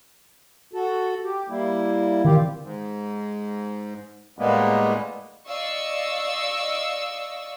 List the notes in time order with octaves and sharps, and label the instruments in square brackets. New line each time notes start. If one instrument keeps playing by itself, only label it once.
[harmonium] F#4 A4
G4
G3 A#3 E4
[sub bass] D#3 [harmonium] C4 F4 G4
[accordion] G#2
A2 G3 G#3 A#3 B3
[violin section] D5 D#5 F5 C#6 E6